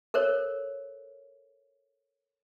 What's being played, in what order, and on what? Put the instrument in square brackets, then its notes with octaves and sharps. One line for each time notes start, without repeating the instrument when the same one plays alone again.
[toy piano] A4 A#4 C5 C#5